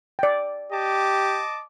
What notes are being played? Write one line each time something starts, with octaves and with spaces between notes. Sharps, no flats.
D5 G5
G4 D#5 A5 D6